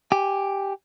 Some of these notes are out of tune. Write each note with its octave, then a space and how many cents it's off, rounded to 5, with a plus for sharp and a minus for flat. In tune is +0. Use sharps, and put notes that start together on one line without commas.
G4 +0 G#5 -15